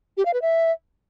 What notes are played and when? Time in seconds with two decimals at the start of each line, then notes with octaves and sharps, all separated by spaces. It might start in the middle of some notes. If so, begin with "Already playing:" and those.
0.17 G4
0.25 F5
0.34 B4
0.42 E5